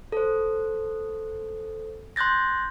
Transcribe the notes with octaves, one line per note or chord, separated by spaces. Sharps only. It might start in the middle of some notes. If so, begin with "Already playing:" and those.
A4 C5
C6 F#6 G6 A6 A#6